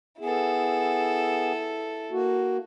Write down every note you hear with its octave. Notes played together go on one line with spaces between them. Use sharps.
B3 E4 G#4 A4
A#3 F#4